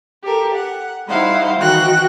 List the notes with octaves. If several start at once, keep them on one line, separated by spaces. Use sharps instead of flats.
G4 A4 A#4
F#5
G3 D#4 E4 C5 F5 F#5
D#3 E3 F#4 G5 F#6 A#6